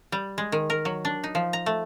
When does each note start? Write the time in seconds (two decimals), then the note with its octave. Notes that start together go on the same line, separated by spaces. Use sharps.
0.12 G3
0.38 G#3
0.52 D#3
0.70 A#4
0.85 F#3
1.05 D4
1.24 D#4
1.35 F3
1.53 A#5
1.66 A3